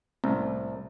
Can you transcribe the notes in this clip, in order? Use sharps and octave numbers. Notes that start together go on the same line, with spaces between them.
C2 A2